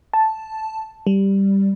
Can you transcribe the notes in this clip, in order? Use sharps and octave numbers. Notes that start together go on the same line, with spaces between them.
A5
G3